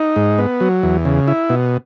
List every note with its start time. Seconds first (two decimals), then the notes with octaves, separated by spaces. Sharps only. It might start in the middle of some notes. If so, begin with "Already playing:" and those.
Already playing: D#4
0.16 G#2
0.38 B3
0.60 F#3
0.83 E2
1.05 C#3
1.28 E4
1.49 B2